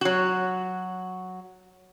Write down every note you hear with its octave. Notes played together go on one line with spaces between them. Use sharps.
F#3 F#4